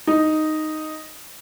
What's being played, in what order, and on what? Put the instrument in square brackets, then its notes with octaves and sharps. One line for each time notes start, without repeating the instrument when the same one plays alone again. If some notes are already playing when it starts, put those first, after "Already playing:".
[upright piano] D#4